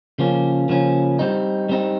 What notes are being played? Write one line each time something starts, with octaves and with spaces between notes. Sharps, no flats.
C#3 F3 A#3 C#4
C#3 F3 A#3 C#4
G3 C4 D#4
G3 C4 D#4